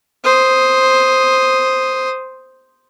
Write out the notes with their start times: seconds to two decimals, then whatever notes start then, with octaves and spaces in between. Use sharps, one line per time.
0.24 C5 D#6